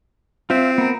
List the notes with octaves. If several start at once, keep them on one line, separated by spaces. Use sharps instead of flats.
C4 F4 C5 E5
B3 A#4